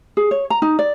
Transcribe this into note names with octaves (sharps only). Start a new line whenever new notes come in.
G#4
C#5
A#5
D#4
D5